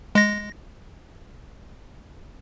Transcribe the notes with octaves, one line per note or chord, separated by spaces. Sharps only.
G#3 A#6